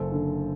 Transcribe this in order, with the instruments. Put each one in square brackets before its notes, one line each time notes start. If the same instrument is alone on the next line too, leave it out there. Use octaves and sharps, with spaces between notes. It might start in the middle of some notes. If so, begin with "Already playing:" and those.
Already playing: [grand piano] F#1 A4 C5
D3